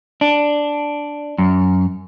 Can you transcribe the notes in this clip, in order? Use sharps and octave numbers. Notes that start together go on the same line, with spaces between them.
D4
F#2